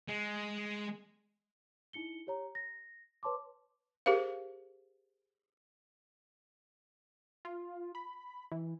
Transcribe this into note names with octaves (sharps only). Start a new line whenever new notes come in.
G#3
D#4 E4 C#7 G7
G4 C#5 A#5
A#6
B4 C#5 A5 C6 D6
G4 G#4 A#4 C5 F5
F4
B5
E3